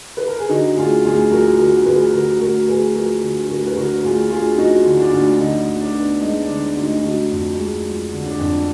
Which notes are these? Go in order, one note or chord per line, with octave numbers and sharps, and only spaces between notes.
B4
A#4
G#4
D3 D#4 F#4
D2 F4 G#4
D2 F4 G#4
F3 F#4 A#4
D3 F#4 A#4
D2 G#4 B4
D3 F#4 A#4
D2 F#4 A#4
D2 G#4 B4
F3 F#4 A#4
D3
D2 F#4 A#4
B4
D3 F#4 A#4
D2 F4 G#4
D2 F4 G#4
F3 D#4 F#4
D3
D4 F4
D2
D3 D#4
D2
D4
B3
G#3 D#4
D4
D3
D4
D2
D#4
D3 D#4 F#4
F2
G#3
F3
D3
D4
F2